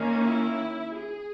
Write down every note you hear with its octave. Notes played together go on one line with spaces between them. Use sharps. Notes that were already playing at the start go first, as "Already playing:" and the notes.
Already playing: D#3 A#3 C#4
E4
G#4